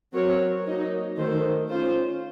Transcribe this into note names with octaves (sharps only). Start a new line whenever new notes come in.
F#3 C4 F#4 A#4 C#5
F#3 A#3 D#4
D#3 A3 D#4 A4 C5
C#4 F4 C5